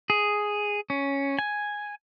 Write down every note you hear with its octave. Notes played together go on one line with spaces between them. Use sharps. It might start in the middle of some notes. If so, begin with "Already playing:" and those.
G#4
C#4
G#5